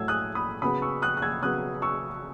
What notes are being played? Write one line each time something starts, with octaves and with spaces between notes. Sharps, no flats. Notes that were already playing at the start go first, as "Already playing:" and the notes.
Already playing: A2 F#3 A3 E6 G#6
D#6 F#6
B5 D#6
C#3 F#3 B3 B5 D#6
C#6 E6
D#6 F#6
F#6
E6 G#6
C#3 F#3 B3 D#6 F#6
C#6 E6